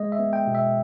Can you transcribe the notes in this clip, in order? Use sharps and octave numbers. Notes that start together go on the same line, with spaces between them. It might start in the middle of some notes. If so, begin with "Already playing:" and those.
Already playing: G#3 D#5
E5
B3
G5
B2
E5